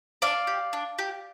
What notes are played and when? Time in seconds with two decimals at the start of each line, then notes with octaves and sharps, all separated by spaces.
0.22 D4 D5 F5
0.47 G4
0.73 D4
0.99 G4